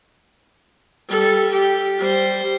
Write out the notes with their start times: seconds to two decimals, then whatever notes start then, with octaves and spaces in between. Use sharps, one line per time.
1.09 G3 A4
1.51 G4
1.98 G3 C5